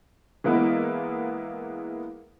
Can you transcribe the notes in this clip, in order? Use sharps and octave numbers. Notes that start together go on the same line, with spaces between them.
E3 G#3 A#3 B3 E4